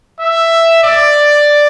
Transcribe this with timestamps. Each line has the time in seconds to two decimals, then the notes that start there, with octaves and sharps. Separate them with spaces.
0.20 E5
0.84 D5